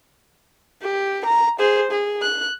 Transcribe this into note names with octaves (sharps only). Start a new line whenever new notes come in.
G4
A#5
G#4 C5
G#4
F#6